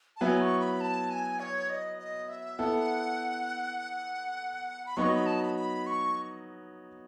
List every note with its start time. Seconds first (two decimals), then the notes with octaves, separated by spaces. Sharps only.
0.16 A5
0.21 F#3 B3 E4 G#5
0.41 C#6
0.60 B5
0.81 A5
1.10 G#5
1.40 C#5
1.69 D#5
1.99 D#5
2.29 E5
2.59 B3 E4 A4 F#5
4.86 B5
4.97 F#3 B3 D#4 F#4 C#6
5.12 B5
5.26 A5
5.41 B5
5.57 B5
5.87 C#6